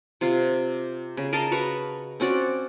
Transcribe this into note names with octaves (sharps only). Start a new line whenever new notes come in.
C3 F4 F5
C#3
A#4 D#5 F5 A5
F#4 B4 A#5 C#6
C4 C#4 F#4 D5